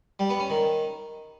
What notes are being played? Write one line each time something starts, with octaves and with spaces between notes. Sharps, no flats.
G3
B3
C#4
D#3